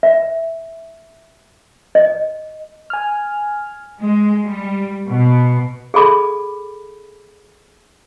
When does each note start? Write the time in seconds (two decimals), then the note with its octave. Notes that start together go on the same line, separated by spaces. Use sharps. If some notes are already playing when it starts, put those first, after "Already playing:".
0.03 E5
1.95 D#5
2.90 G#5 F6
4.00 G#3
4.44 G3
5.08 B2
5.94 G#4 A4 B5 D6